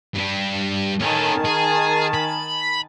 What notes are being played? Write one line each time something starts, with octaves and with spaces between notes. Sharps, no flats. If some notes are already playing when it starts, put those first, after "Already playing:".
G2 G3
D#3 C#4 A4 G#5 A5
G#4
B5